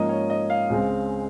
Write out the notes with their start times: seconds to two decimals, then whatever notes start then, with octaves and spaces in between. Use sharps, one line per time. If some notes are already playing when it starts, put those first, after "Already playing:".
Already playing: G#2 F3 A#3 C#4 D#5
0.09 C#5
0.30 D#5
0.50 F5
0.70 C#2 C#3 G#3 C4